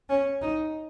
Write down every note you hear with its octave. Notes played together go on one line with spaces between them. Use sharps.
C#4
D#4